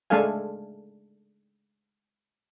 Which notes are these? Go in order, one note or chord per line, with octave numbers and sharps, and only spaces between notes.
G#3 A3 D4 A4 F5 G#5